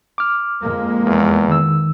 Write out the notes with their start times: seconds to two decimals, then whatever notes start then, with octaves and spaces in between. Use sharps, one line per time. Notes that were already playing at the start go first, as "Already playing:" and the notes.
0.18 D6 F6
0.61 F2 G#3 A#3
1.06 E2
1.48 D#3 E6